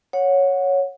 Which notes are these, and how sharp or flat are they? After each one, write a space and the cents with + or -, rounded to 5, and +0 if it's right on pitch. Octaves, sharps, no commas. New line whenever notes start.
C#5 +0 F#5 -20